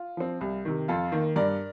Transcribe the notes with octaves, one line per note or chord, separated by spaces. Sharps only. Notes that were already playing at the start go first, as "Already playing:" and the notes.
Already playing: F4
F3 C4
C2
C3 D#3
F2 F4 A4
D#3 A#3
G2 A#4 D5